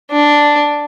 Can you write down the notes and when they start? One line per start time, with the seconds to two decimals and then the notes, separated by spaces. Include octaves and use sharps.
0.12 D4